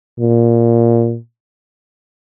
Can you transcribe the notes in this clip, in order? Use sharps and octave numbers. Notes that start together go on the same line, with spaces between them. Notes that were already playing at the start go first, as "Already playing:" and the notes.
A#2